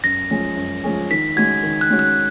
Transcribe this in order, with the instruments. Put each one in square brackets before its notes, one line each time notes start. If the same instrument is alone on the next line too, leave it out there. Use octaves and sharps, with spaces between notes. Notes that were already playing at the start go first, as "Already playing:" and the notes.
[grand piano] F#2 [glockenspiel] A#6
[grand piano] F3 G#3 C#4 G#4
F#2
F3 G#3 C#4 G#4
[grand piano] D#3 [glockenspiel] B6
[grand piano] G#3 C#4 F#4 [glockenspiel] G#6
[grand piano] D#3
[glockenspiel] F#6
[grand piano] G#3 C#4 F#4
[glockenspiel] F#6